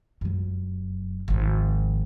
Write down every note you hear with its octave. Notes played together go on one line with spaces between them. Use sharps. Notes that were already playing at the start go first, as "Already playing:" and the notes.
F1 F#2
G#1 F3